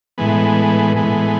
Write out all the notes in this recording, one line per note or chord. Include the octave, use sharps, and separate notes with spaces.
A2 E3 G#3 B3
A2 E3 G#3 B3